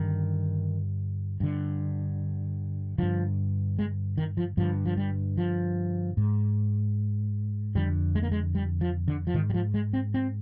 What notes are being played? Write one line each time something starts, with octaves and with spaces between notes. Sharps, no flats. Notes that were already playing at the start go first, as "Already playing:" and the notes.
Already playing: G2 D3 D#3
G2 D3
G2 D3 F3
G#3
D#3
F3
G2 D3 F3
F3
G3
F3
G#2
F2 D3 G3
G#3
A#3
G#3
G3
F3
D3
F3
G#2 D#3
G3
F3
G#3
C4
C4